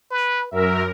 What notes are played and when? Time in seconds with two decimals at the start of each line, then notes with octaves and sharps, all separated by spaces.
0.11 B4
0.51 F#2 A#4 E5